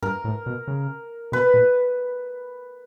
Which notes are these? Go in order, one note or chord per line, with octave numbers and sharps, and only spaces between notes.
G2 A#4
A2
B2
C#3
B2 B4
A#2